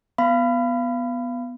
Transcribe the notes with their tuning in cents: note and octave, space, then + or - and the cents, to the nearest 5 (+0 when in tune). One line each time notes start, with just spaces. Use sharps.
B3 +0 F5 -25 B5 +20